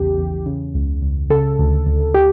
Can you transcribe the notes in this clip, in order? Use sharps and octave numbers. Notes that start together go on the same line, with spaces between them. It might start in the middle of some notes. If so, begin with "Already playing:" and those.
Already playing: A#1 E2 C#3 G4
E2
C#3
C#2
C#2
C#3 A4
D2
D2
G4